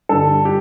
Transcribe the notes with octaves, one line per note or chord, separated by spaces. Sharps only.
G2 D3 G3 A4
G4